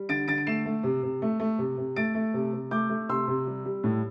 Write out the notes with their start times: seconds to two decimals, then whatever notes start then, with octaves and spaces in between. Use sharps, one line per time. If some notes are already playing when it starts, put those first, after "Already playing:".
Already playing: G3
0.09 D3 A6 D7
0.28 D3 A6 D7
0.38 D7
0.47 A3 C7 E7
0.66 A3
0.83 C3
1.03 C3
1.22 A3
1.40 A3
1.58 C3
1.78 C3
1.96 A3 A6 D7
2.15 A3
2.34 C3
2.53 C3
2.71 A3 D6 G6
2.90 A3
3.09 C3 C6 E6
3.28 C3
3.47 G3
3.65 G3
3.84 A2